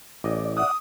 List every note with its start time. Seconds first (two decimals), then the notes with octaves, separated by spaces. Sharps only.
0.24 A1 D5 D#5
0.57 D5 E5 F#5 D#6